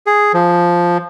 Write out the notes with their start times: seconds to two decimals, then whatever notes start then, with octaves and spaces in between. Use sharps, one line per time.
0.07 G#4
0.34 F3